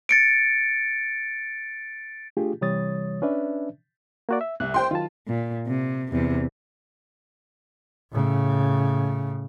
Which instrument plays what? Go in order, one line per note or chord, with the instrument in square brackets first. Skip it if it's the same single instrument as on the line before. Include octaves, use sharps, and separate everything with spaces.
[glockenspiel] A6 C#7 D7
[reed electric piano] A3 D4 F4 G4 G#4
C3 E3 G3 C#5 D#6 A6
C#4 D4 B4 D5 E5
A#3 F#4 D5
E5
[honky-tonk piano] C2 [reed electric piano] F#6
[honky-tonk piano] C5 G5 C6
[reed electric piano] D#3 F#3 A5 [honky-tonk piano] F4
[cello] A#2
C3
E2 C3
[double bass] A2 C#3